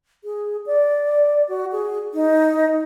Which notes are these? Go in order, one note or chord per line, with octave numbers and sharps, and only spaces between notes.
G#4
D5
F#4
G#4
D#4